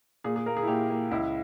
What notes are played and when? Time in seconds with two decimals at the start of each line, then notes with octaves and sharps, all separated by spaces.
0.24 A#2 G#4
0.36 G#4
0.46 A#3 A#4
0.57 G#4
0.63 E4
0.68 A#2 G4
0.89 A#3
1.11 C#2 E4